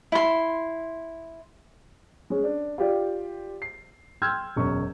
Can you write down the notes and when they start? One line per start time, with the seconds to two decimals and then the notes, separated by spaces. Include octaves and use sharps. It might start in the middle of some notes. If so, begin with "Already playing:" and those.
0.12 E4 C6
2.30 G#3 C#4
2.44 D4
2.78 F4 G4 D5
3.62 C7
4.22 G5 C6 E6 F6 G6 G#6
4.56 E1 F#2 C#6